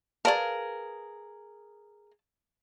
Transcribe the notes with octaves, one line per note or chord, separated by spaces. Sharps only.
G#4 A#4 B4 D5 F5 A5